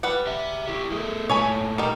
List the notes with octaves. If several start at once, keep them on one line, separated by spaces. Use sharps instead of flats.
G3 B4 F#5
G4 E5
E4 G4
A3 G#4
A#2 A3 C#5 G#5 B5
D#3 G3